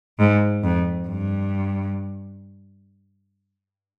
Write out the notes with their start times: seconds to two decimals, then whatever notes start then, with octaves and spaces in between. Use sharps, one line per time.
0.19 G#2
0.63 F2
1.08 G2